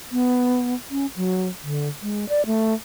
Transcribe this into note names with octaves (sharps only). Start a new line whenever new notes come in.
B3
C#4
F#3
D3
G#3
D5
A3